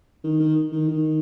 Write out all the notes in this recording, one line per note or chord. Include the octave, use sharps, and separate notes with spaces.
D#3
D#3
D#3
D#3